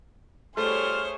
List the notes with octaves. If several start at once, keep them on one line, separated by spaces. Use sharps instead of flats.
G3 A3 G#4 C5 C#5 C6 F6